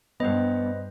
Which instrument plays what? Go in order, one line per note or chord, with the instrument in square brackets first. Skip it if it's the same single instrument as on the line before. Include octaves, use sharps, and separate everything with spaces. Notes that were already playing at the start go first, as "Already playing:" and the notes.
[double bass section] G2 [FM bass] B3 [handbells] B4 C5 D#5